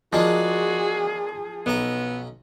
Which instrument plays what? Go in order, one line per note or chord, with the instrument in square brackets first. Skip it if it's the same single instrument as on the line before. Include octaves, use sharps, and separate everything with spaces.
[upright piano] F3 [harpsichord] G#3 A#3 D4 [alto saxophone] F#4 [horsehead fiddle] G#4
[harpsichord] B1 C#4 A#5 [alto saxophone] B3